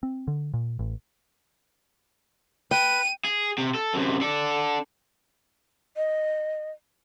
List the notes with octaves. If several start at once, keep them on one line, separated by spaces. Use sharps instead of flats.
C4
D3
A#2
A1
B4 G5 D#7
G#4
C3
A4
F#2 C3
D4 A4
D#5